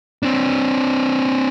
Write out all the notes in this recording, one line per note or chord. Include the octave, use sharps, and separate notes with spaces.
C4 D4